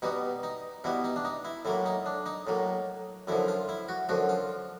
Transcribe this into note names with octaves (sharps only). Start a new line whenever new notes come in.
B2 G3 B3 D#4
D#4
B2 G3 B3 E4
D#4
D4
D#4
E4
A2 F#3 A#3 E4
D#4
D4
D#4
A2 F#3 A#3
F#2 D3 F3 E4
F4
E4
F#4
F#2 D3 F3 F#4
F4